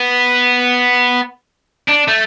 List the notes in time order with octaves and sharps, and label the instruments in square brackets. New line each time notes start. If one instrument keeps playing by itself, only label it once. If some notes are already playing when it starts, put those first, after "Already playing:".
Already playing: [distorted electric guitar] B3
D4
A3